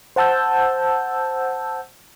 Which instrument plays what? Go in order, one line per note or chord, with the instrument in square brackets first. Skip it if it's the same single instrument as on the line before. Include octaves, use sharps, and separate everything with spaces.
[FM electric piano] C5 F#5 A5 E6 G6